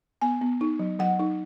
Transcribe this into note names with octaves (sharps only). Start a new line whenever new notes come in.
B3 G#5
B3
D#4
F#3
F#3 F#5
D#4